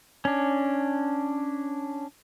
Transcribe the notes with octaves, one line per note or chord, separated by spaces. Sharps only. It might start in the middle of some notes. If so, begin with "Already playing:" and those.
C#4 D4